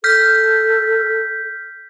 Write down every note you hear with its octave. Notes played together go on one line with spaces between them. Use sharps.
A4 F6 G6 B6